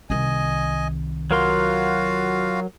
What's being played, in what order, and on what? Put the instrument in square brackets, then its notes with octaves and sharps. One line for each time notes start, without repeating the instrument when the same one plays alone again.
[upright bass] C2 D#3 [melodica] D#5 G#5
[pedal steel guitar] F#3 A#4 C6 [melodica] F4 F#4 F5